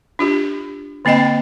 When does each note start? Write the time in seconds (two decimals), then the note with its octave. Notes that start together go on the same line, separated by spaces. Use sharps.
0.19 D4 F4 G4
1.05 D3 A#3 C4 D#5 G5